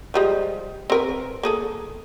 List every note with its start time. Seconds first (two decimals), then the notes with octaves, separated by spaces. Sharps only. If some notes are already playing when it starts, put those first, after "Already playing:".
0.14 F3 G3 G#3
0.90 C4 A#4 B4
1.43 A#3 G#4 A4